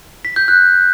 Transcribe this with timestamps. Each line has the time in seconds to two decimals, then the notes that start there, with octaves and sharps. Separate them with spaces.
0.25 B6
0.36 G6
0.48 F#6